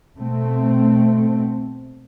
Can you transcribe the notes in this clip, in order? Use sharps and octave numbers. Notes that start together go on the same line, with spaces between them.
B2 A3 C4